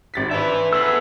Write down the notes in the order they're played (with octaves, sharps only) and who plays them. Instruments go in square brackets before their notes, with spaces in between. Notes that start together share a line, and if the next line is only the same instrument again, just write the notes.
[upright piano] G#1 A6 B6
[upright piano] D4 C5 [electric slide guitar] B4 E5
[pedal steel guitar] B3 G#4 E6 [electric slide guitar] A4 B4 [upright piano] E5 C7